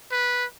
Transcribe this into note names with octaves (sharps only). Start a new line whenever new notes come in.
B4